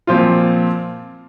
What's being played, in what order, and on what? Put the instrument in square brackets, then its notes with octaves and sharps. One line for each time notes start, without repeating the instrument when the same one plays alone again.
[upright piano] A#2 F3 C4 F4